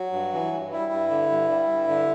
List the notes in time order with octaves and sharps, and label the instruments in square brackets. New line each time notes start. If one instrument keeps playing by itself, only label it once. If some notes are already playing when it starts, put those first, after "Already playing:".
Already playing: [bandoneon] F#3 F#4
G2
E3
G2
G3 E4
G2
D3
G2
G3
G2
D3